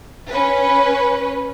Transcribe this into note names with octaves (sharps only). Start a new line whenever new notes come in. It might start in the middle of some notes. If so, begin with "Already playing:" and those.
C#4 B4